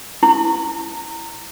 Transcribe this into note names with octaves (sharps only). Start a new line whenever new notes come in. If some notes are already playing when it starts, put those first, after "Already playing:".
E4